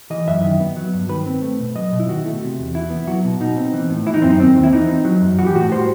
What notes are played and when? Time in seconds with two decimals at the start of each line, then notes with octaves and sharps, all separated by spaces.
0.10 E3 D#5
0.27 F#2 E5
0.44 D#3
0.60 B3
0.76 F#3
0.93 G2
1.09 D#3 B4
1.26 C4
1.42 A3
1.60 B2
1.75 F#3 D#5
1.93 B2
2.00 E4
2.08 D#3 F#4
2.26 A3
2.41 C3
2.58 E2
2.74 E3 E4
2.90 B3
3.07 F#3 F#4
3.24 B2
3.40 B2 D#4
3.56 C4
3.73 E3
3.90 A2
4.06 E3 E4
4.14 D#4
4.22 F#2 C4
4.30 D#4
4.39 D#3 C4
4.56 D#2
4.63 E4
4.73 E3 D#4
4.89 C4
5.05 F#3
5.21 F#2
5.39 E3 F#4
5.47 G4
5.55 A2 F#4
5.71 G3 C5